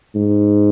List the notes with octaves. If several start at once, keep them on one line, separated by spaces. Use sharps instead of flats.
G#2